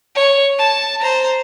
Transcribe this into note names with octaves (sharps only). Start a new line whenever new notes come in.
C#5
A5
C5 A#5